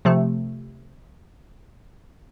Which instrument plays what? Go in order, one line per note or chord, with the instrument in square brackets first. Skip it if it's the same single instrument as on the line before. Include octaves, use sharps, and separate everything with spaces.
[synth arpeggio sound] C3 F3 A3